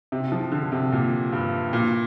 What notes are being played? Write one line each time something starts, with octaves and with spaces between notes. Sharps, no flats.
C3
F3
D3
C3
A#2
G2
A#2